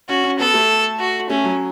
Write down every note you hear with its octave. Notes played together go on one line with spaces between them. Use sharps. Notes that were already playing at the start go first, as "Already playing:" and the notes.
C#4 F#4
C#4
B3 A4
A3
F#4
A3 C#4
F#3